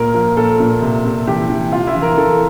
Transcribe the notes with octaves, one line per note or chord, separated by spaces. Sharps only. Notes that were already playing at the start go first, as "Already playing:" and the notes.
Already playing: A#2 A#4
F3
A#2 A4
A#2
C3
C3
E3 G4
E3
C3 F4
E4
E3
A#4
E3 A4